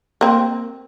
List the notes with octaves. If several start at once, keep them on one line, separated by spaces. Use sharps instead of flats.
A#3 C4